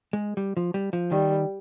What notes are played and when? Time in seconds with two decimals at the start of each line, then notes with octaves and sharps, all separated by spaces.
0.13 G#3
0.37 G3
0.57 F3
0.74 G3
0.93 F3
1.11 D#3 G3